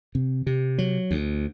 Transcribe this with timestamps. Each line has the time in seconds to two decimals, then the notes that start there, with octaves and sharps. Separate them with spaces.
0.15 C3
0.47 C3
0.78 F#3
1.11 D2